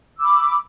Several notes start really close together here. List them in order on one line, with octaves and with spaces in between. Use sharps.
E6 D6 B5